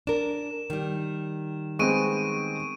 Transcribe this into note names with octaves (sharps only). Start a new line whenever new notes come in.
D4 A#4 E7
D#3 G3
G#3 B3 C4 C#6 D7 D#7